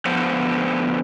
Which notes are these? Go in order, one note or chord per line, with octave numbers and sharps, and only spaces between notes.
D3 F3 B3 C5